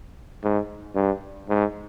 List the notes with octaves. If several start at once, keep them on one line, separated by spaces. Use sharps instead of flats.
G#2
G2
G#2